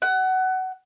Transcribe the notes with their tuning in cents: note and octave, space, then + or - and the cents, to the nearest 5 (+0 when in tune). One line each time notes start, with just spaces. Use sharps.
F#5 +20